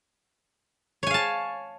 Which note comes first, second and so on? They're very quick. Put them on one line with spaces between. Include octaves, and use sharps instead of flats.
C#5 G#5 F5 A5